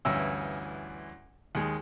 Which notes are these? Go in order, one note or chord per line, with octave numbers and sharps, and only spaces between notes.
D2 G2 E3 C#4 E4 E6
D#2 G#3